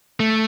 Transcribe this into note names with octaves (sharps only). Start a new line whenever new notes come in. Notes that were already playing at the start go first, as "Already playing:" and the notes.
A3